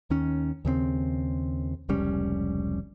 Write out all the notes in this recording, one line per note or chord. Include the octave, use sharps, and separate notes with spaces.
D#2 D#3 C#4
D#2 C#3 A3 C4
F1 C#2 G3 C#4